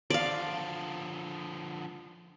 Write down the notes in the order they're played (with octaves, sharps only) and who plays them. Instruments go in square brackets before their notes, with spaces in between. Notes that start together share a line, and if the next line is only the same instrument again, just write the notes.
[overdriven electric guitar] D3 F3 [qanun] D5 F5